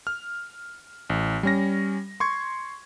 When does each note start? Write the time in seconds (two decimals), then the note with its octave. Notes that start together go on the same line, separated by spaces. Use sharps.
0.07 F6
1.10 A1
1.43 G3 C#4 A#6
2.20 C6 C#6 G#6